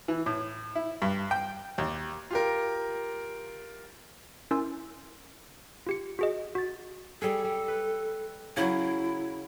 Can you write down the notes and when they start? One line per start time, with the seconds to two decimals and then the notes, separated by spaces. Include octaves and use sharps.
0.08 E3
0.26 A2
0.75 E4
1.02 G2
1.31 G5
1.78 D#2
2.31 F4 G4 A#4
4.51 C#4 E4 A#4 G#5 C6 E6
5.87 F4 G4 C#7
6.19 F#4 G#4 D#5
6.55 F#4 A6
7.22 G3 G#4 A4
7.44 G3
7.68 B4
8.57 C#3 F#3 E4